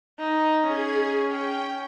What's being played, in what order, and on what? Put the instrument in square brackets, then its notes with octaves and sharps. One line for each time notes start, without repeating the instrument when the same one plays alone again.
[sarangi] D#4
[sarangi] C#4 [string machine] G#4 G#6
[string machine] G5